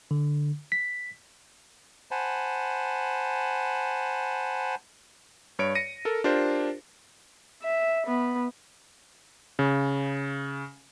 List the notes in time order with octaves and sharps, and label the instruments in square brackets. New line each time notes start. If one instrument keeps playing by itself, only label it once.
[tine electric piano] D3
B6
[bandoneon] C5 F#5 G#5 A5 B5
[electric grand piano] G2 C#5 D7
A#6 C#7 D#7
A4 A#4
D4 F4 G4 A#4 C5
[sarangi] E5
B3
[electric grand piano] C#3